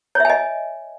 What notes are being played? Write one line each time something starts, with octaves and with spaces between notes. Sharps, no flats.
C#5 D#5 E5 G#5